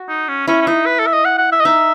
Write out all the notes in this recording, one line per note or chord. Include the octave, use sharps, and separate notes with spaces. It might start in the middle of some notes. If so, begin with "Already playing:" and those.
Already playing: F#4
D#4
C#4
C#4 E4
C#4
D#4 E4
B4
A4
E5
D#5
F#5
F#5
E5
D#5
D#4 E5